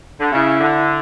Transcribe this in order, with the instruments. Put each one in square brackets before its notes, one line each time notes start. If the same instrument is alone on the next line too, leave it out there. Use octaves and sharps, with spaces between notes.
[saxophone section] D3
[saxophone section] C#3 [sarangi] E4
[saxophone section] D3